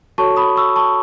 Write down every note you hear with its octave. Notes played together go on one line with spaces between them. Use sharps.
F#4 A4 C#5 A5 C#6
B5 D#6
C#6 E6
A5 C#6